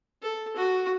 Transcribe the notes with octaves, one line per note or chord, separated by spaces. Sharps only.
A4
F#4